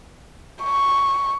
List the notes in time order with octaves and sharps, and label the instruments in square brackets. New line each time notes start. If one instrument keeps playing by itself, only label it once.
[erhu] C#6